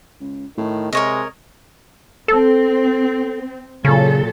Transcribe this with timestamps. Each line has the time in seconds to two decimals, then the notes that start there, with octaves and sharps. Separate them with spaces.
0.20 C#2
0.58 A2 D#3
0.93 C3 G#3 A#4 C#5 D#5
2.28 C4 A4
3.85 A#2 C#3 F#3 A4